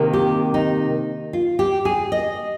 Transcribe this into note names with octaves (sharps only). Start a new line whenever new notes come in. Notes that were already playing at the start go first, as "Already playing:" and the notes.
Already playing: C3 D#3 A#3
G4
D#4
F4
G4
G#4
D#5